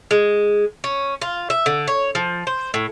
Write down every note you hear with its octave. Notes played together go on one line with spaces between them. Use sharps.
G#3
C#4
F4
E5
D3
C#5
F3
C5
A2